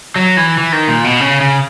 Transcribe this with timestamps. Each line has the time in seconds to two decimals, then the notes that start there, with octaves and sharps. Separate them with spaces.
0.16 F#3
0.37 E3
0.58 E3
0.72 D#3
0.88 A#2
1.04 B2
1.20 C#3
1.40 C#3